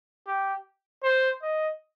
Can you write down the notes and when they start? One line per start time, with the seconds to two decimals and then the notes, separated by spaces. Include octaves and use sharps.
0.27 G4
1.03 C5
1.42 D#5